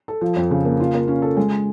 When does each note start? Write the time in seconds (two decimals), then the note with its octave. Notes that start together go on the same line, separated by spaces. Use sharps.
0.08 A4
0.21 F3
0.36 F2
0.51 C#3
0.65 A#3
0.80 F4
0.94 A#3
1.08 C#4
1.22 A4
1.37 G#3